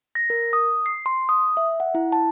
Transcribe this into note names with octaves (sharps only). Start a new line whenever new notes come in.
A#6
A#4
D#6
C7
C6
D#6
E5
F#5
E4
A5